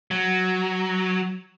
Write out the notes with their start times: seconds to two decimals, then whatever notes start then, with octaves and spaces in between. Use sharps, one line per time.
0.11 F#3